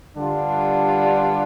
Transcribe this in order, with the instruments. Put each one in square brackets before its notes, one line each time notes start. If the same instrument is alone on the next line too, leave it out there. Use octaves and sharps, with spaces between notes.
[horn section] G2 D3 G3 D4 F4